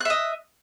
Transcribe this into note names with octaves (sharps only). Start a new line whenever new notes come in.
D#5 E5 F#6